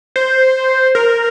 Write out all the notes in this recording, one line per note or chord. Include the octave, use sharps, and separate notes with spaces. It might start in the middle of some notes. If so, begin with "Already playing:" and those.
C5
A#4